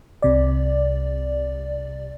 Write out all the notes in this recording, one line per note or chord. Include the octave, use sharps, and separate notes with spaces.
C2 C3 D5